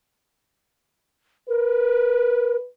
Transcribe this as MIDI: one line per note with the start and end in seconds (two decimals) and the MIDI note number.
1.49 2.56 70
1.49 2.67 71